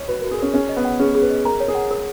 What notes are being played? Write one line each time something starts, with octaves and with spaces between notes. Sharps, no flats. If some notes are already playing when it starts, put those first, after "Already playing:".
Already playing: C#5 D#5
F#4 B4
A#4
F#4
G#4
C#4 A#4
C#4 G#4
D#5
B3
F#5
C#4 G#4
G#4
B4
D#5
A#4 A#5
C#5
G#4
F#5
A#4